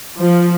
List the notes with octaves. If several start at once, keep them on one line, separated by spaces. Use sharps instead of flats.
F3